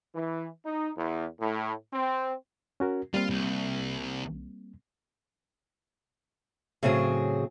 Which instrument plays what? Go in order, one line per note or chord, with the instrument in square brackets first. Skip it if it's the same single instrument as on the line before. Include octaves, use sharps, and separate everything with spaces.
[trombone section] E3
D#4
E2
A2
C4
[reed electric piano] C#4 F#4 A#4
[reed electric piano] G3 A#3 C4 [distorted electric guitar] F4 F5
[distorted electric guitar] C2
[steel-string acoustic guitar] A2 C#3 F#3 C4 G#4